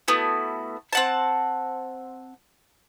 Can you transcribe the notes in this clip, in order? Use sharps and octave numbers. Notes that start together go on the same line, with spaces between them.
A3 B3 E4 F#4
C4 F#5 A5